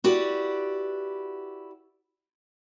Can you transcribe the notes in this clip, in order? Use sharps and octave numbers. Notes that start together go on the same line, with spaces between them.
E4 F#4 G4 B4 D5